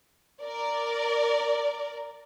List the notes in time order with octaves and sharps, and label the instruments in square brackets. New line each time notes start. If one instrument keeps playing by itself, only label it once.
[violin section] A#4 D5